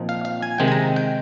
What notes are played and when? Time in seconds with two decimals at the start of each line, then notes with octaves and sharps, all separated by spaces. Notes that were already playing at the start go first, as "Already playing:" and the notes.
Already playing: A#2 F3 C4 D#4
0.09 F5
0.25 F5
0.42 G#5
0.58 C3 D#3 G#3 C4 D#4 G5
0.68 G#5
0.72 A#5
0.96 G5